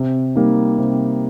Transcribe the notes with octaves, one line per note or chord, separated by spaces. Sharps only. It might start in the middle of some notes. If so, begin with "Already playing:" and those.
Already playing: C3
G3 A#3 D#4
C3